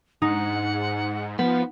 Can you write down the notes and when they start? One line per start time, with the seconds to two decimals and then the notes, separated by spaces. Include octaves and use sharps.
0.22 G#2 D#4 F#5
1.39 F3 B3